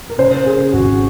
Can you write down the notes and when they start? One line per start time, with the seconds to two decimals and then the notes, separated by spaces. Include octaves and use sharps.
0.10 A#4
0.18 C#3 C5
0.46 C#3 G#4
0.73 G#1 F#4